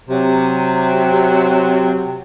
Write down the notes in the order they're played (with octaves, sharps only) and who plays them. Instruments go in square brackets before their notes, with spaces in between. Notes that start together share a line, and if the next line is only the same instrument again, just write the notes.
[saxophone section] C3 F#3